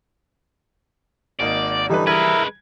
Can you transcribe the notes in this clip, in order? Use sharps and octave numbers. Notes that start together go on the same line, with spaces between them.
G#1 A#3 D#4 D5
D3 E3 G3 D#4 A4 B4
G#3 E4 A#4 B4 G#6